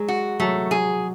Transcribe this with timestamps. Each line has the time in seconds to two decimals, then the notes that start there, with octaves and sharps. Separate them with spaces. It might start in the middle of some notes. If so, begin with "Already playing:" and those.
Already playing: F#3 G#3
0.08 F#4
0.40 F#3 A3
0.71 G#4